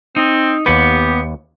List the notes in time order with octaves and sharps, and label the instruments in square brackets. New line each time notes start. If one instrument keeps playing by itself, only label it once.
[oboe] C4 [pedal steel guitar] D#4
[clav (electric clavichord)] D#2 B4 [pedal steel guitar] B3 F#5 [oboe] G4